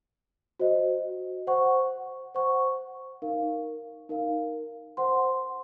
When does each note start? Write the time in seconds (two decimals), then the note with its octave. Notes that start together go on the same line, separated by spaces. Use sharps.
0.60 F#4 C5 D#5
1.47 C5 F#5 C#6
2.35 C5 F#5 C#6
3.22 D#4 A#4 F5
4.09 D#4 A#4 F5
4.97 C5 F#5 C6